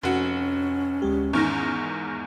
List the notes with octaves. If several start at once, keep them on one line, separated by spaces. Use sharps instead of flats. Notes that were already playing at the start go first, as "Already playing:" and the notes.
F1 F2 C#4 F#4
D2 G#3 G4
E2 G#2 D#3 C#6 F6 A#6